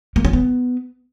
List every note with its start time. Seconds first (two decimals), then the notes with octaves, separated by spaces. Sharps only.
0.16 A#3
0.25 C#4
0.33 B3